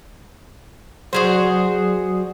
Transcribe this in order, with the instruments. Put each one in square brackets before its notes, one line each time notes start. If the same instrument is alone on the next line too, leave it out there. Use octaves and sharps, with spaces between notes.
[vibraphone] F#3 D5 D#6 [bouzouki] F#4 G#4 C5